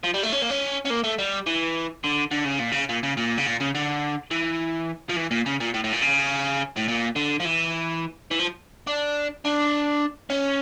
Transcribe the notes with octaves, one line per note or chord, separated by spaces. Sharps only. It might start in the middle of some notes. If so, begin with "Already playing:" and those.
F3
G3
A3
C#4
A#3
C#4
C#4
A#3
A3
G3
E3
D3
D3
C#3
A#2
C#3
A#2
C#3
A#2
C#3
A#2
C#3
D3
E3
F3
E3
A#2
C#3
A#2
A2
A2
A#2
C#3
A2
A#2
D3
F3
E3
E3
F3
D4
D4
C#4